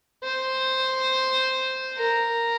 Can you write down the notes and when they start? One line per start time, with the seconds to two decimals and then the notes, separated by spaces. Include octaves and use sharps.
0.23 C5
1.98 A#4